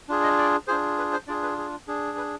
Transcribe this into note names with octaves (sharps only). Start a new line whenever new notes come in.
D4 F4 G#4
D#5
D5
D4 F4 G#4 C5
B4
C5
D4 F4 G#4 D5
B4
G#4
D4 G#4
B4